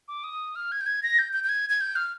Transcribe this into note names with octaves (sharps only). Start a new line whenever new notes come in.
D6
D#6
F6
G#6
G6
G#6
A#6
G6
G6
G6
G#6
G#6
G6
F6